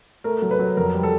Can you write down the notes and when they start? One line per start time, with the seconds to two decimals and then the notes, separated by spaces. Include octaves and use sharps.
0.24 A3 A#4
0.42 F#3
0.51 B4
0.59 F#3
0.77 F2 A#4
0.94 G3
1.03 A4